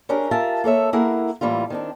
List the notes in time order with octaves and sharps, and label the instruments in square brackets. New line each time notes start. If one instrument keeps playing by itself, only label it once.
[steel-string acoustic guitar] C#4 D4 G4 G#4 A#4
F4 G4 A#4 E5 G#5 A5
A#3 A4 C#5 E5
A#3 E4 G#4 A#4 F#5
A2 E3 G3 A#3 F4
D#3 C4 D4